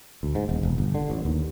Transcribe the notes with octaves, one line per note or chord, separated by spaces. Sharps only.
D2
G#2
D#1
E1
G1
D3
A1
D#2